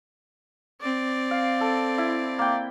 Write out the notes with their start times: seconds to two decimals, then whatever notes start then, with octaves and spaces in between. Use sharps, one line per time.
0.81 C4 D5
1.31 F5
1.61 A4
1.98 E4
2.39 A#3 G5